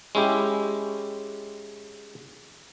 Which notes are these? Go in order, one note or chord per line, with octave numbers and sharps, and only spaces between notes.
G#3 C#4 E4 G4